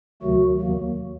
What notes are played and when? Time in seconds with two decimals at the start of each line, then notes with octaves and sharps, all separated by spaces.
0.22 D2 C3 D#3 F#3 A3 F#4
0.60 D#2 D#3 F#3 A#3